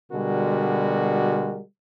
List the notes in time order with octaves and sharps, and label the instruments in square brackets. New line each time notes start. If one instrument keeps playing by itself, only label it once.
[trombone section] B2 D3 G3 G#3 F#4 A#4